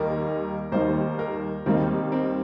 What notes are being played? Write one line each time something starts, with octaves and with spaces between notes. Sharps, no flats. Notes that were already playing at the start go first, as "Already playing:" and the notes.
Already playing: D#2 D#3 G3 A#3 D#4 A#4
D#2 D#3 G3 A#3 D#4 C5
A#4
D#2 D#3 G3 A#3 C4 D#4
C4